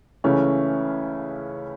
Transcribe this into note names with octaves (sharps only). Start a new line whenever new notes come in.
C#2 C#3 E3 A3 C#4